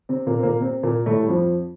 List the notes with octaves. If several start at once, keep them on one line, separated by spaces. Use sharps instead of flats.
C3 C4
A#2 A#3
C4
A#2 A#3
C3 C4
A#2 A#3
A2 A3
G3
F2 F3